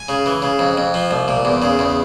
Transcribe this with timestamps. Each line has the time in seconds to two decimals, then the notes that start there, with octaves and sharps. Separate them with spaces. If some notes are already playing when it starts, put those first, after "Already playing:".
Already playing: G#5
0.09 C#3
0.26 E3
0.42 C#3
0.59 F2
0.78 F2
0.94 F3
1.11 C2
1.28 A#2
1.45 E2
1.62 C#3
1.79 E2